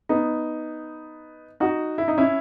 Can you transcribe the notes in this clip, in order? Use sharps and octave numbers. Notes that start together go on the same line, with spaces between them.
B3 D#4
D#4 F#4
E4
D#4
C#4 E4